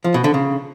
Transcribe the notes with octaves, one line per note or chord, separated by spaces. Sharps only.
F3
B2
D3
C#3